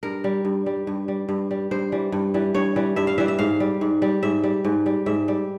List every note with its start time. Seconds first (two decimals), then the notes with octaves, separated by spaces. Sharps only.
0.03 G2 A#4
0.24 G3
0.45 G2
0.66 G3
0.87 G2
1.08 G3
1.29 G2
1.51 G3
1.71 G2 C5
1.92 E3 G3
2.12 G2
2.34 E3 G3
2.55 G2 C#5
2.76 E3 G3
2.96 G2 E5
3.07 F5
3.18 E3 G3 E5
3.28 E5
3.39 G#2 F5
3.60 G3
3.81 G#2
4.02 G3
4.23 G#2 E5
4.43 G3
4.65 G#2
4.86 G3
5.06 G#2 E5
5.28 G3